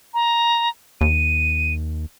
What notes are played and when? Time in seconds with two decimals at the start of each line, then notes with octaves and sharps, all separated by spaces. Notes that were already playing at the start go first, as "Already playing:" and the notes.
0.14 A#5
1.01 D#2 D#7